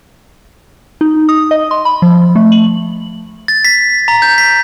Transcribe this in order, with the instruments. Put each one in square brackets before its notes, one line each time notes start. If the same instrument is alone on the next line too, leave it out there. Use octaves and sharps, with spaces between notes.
[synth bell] D#4
D#6
D#5
C6
B5
F3
A3
F#7
[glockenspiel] A6
B6
A#5
G6
B6